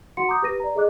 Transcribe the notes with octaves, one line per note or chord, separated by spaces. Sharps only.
F#4 F#5 C6 C#7
A#5 D6 D#6 G6
G4 B4 A#6 D#7
D5 A#5
G#4 A4 D#5 D6 F#6